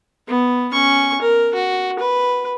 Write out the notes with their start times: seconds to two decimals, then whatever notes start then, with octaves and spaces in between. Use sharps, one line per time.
0.28 B3
0.72 C#4 C#6
1.22 A#4
1.55 F#4
1.99 B4